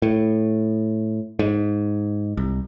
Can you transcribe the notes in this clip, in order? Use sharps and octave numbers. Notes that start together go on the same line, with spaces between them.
A2
G#2
C2